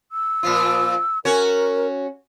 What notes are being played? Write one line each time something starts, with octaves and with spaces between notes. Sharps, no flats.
E6
A#2 F3 F4
C#4 F#4 A#4 C#5